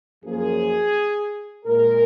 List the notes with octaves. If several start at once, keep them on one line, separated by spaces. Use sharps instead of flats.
F#2 F3 A#3 G#4
A#2 G#3 A#4